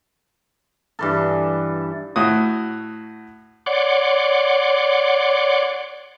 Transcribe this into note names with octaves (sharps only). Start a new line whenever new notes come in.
G2 E3 A4
A2 F#4 D#6
C#5 D5 F#5 C6 D6